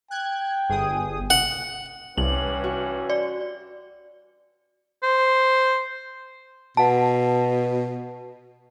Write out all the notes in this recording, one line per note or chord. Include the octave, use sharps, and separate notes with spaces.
G5 F#6 G#6
G1 G#4 D#6
F#5
C2 G2 E3 C#4 F#7
F#4
D5
C5
B2 F#5 A5